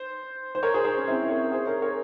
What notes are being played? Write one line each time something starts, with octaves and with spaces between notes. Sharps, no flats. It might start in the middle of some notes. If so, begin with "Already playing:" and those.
Already playing: C5
C5
A#4 C#5
G#4 C5
G#4 C5
C#4
C4 E4
A#4 C#5
G#4 C5
A#4 C#5
A#4 C#5